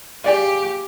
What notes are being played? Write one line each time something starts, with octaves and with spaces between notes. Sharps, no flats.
G4 G#4 D5 F5